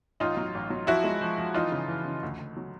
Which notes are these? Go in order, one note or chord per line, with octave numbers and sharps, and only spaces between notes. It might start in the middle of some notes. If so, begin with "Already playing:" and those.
A1 D#4 F4
F#3
A1
F#3
F3 E4 F#4
G#3
F3
F3
E3 D#4 F4
C#3
E3
C#3
D2
D2
F#3